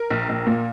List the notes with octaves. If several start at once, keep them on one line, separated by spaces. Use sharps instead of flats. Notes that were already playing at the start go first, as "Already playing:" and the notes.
Already playing: A#4
A#1
A#1
A#2